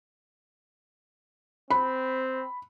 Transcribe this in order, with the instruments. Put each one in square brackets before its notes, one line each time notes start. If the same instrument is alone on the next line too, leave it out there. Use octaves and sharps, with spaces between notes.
[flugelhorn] C4 [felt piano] B5